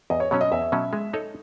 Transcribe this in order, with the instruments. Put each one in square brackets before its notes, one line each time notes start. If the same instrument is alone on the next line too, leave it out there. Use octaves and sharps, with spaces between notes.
[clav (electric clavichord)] E2 [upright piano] D#5
[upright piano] C#5
[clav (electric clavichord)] B2 F#3 C#4 [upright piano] C#5
[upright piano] D#5
[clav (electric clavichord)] E2 [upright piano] E5
[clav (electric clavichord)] B2 F#3 C#4
G#3
D#4 A4 C#5